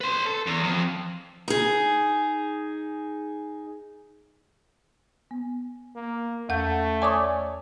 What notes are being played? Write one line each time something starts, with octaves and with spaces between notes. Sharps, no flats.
B4 C6
A4
E2
F2
D#4 G#4
B3
A#3
E2 A3 F#5 G6
C#5 D5 G#5 C#6 D#6